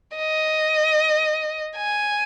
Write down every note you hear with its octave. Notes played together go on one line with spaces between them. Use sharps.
D#5
G#5